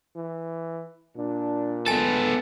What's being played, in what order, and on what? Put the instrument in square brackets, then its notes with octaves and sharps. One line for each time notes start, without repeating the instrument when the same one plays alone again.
[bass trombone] E3
[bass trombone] A#2 [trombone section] D4
[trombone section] C#2 D3 B4 [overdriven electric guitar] B3 A4 [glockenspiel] G#5 A6